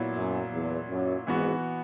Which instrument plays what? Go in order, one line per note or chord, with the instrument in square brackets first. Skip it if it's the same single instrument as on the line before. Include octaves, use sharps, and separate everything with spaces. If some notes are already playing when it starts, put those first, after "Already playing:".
Already playing: [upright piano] A#2 F#3 B3 E4
[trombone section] F#2
E2
F#2
[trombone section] G#1 G#2 [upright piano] E3 B3 F#4